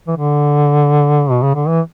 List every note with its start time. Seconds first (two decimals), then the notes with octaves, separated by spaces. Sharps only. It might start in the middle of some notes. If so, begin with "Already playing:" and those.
0.08 E3
0.17 D3
1.30 B2
1.43 C#3
1.55 D3
1.68 E3